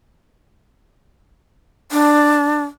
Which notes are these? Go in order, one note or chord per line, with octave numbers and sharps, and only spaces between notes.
D4